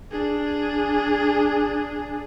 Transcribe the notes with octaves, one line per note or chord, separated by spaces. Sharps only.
D4 G#4